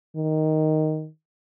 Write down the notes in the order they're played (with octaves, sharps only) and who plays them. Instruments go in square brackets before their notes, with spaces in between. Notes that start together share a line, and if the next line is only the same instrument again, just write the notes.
[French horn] D#3